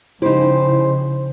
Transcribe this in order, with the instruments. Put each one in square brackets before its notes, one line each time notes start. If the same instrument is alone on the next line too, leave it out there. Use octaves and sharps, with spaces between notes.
[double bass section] C#3 F3 [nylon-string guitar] D#4 G4 [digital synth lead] E4 [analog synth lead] C5